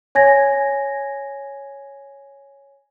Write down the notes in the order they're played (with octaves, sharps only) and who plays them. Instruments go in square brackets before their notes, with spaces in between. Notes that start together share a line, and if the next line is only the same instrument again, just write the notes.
[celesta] C#5 G#5 G#6 A#6